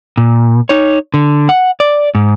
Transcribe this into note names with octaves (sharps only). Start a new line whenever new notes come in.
A#2
D#4 C#5
D3
F#5
D5
G#2